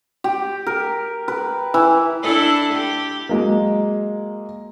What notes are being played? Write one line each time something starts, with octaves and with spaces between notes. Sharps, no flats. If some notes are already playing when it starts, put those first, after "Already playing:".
G4
A#4
B4
E3
D4 E4 A4
G4
F#3 G#3 A#3